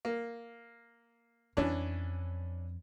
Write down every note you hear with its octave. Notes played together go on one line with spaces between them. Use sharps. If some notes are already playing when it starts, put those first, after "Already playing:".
A#3
F2 E3 C#4 D4